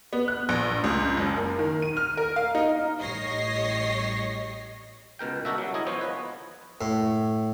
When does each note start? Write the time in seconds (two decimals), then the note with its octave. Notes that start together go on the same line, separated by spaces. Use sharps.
0.13 B3
0.28 F#6
0.49 A#1
0.84 C#2
1.17 F#1
1.37 A#3
1.59 D#3
1.82 D#7
1.97 F6
2.17 A#4
2.36 F5
2.55 D#4
2.99 A1 G3 C#5 D#5 A#6 C7
5.19 C#2 B2 A#4 G5
5.45 D4 D#4 F#4 A4 A#4 E5
5.58 F#3 G3
5.74 E4 G#4 D#5 G#5
5.87 F3 B3 C5 C#5
6.01 B4 D#5
6.81 A2